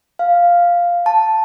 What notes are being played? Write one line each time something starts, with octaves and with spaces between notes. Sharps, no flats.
F5
A5